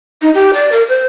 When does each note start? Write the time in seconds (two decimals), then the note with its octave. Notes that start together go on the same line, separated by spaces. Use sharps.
0.22 D#4
0.35 G4
0.54 D5
0.72 A#4
0.89 C5